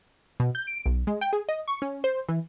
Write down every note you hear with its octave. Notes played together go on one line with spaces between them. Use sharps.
B2
G6
D7
B1
G#3
G5
G#4
D#5
C#6
C#4
C5
E3